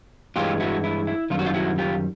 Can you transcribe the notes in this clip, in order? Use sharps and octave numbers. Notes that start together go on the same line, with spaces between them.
G2 E3 G#3 F4 G4
E4 F#4
E4
E4
F#2 D#3 G3 F4
F#4
D#4 F4
E4 F#4
F4 G4